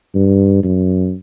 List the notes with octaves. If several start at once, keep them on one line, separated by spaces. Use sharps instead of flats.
G2
F#2